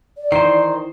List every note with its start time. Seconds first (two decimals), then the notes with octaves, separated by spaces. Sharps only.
0.17 D5
0.32 D#3 E3 C5 C7